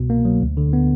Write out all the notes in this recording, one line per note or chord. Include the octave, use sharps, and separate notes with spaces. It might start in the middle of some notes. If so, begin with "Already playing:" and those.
Already playing: C2 B2
A#3
F#3
D2
D3
B3